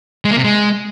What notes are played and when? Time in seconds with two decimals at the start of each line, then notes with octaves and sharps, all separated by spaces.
0.25 G#3
0.31 A#3
0.38 C3
0.44 G#3